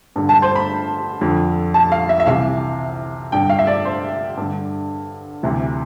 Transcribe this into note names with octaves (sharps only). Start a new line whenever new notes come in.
G2 D3
A5
C5
B5
F2 D3
A5
F5
E5
E5
C2 C3 E3 F5
G2 D3 G5
F5
E5
D5
C5
G2 D3
D2 C3 E3